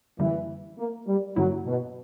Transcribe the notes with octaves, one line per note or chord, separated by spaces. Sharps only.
F#2 D3 E3 G3 A#3
A#3
G3
G2 D3 F#3 A#3 E4
B2